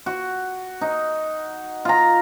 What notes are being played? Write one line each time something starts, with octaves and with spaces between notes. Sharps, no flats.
F#4
D#4
F4 A#5